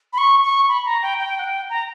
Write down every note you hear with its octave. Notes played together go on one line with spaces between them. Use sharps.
B5
C#6
C#6
B5
A#5
G5
G5
F#5
G5
A#5